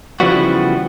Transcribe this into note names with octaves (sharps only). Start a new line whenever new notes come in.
C#3 E3 F3 G3 B3 F#4